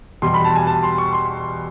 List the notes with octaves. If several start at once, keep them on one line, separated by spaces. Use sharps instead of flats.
E2 B2 G3 C6
B5
A5
G#5
A5
C6
C#6
C6